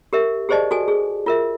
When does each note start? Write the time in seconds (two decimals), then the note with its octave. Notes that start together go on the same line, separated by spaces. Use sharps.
0.13 G4 A#4 E5
0.49 G4 G#4 C5 D5 D#5 A5
0.71 F#4 A4 G#5
0.88 G#4
1.26 F4 A#4 E5